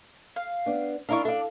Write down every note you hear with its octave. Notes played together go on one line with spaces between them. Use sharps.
F5
B3 D4
D4 E4 F4 A#4 C#6
D4 A4 D5 F5